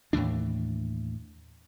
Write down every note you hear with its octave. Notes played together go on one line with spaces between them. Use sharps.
D#2 A2 E3 D4